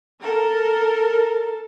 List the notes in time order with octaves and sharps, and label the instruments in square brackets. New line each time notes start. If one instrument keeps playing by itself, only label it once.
[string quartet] A4 [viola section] A#4